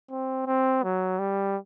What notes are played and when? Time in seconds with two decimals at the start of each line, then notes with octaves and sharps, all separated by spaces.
0.10 C4
0.46 C4
0.83 F#3
1.19 G3